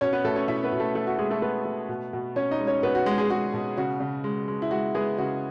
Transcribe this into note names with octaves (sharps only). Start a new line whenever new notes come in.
B2 C#4 C#5
B3 B4
B2 A3 A4
C#4 C#5
B2 E4 E5
B3 B4
B2
A3 A4
A3 A4
F#4
G#3 A3 G#4
A3 A4
A3 B3 B4
A3
B2
B2
B2 C#4 C#5
D#4 D#5
G#3
C#4 C#5
B2 B3 B4
F#4
G#3 B3 G#4
G#3 G#4
G#3 F#4
B2
C#3 F#4
C#3
G#3
G#3
E4
G#3 F#4
G#3 B3 G#4
C#3 F#4